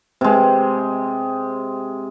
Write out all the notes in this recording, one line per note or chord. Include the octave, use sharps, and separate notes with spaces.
C3 G#3